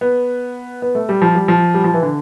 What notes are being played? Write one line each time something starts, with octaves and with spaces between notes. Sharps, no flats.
B3
B3
A3
G3
F3
G3
F3
G3
F3
E3
D3